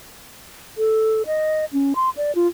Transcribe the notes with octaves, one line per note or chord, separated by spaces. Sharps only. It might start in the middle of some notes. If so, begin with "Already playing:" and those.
A4
D#5
C#4
C6
D5
F4